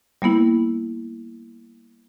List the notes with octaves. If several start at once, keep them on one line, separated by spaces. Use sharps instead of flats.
G3 A#3 B3 E4